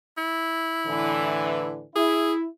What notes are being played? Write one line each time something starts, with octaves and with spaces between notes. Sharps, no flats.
E4
A2 D3 E3
E4 G#4